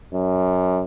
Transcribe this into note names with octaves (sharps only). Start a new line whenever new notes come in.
F#2